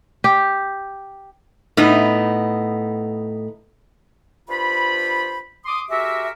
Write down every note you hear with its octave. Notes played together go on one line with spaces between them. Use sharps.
G4
A2 B3 D#4
G2 F4 C5 B5
C6 D6 D#6
G#3 F#4 G4 A#4 E5